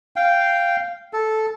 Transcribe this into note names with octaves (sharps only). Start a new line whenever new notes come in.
F5 G5
A4